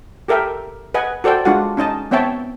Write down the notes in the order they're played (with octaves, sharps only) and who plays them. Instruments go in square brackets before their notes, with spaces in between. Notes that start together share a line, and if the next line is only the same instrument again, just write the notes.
[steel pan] G4 A4 A#4 E5 G5
B4 D#5 F#5 G#5
F#4 A4 C5 D5 G5
G#3 D4 F4 F#4 F#5
C#4 D#4 D#5 A5
B3 C4 C#5 E5 G5 A5